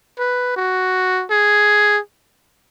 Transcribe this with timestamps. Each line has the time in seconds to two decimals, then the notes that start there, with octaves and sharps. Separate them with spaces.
0.19 B4
0.56 F#4
1.31 G#4